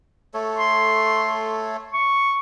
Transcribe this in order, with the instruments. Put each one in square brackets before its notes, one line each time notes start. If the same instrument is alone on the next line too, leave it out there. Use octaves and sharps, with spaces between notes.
[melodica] A3 A4 C#5
[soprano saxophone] C6
C#6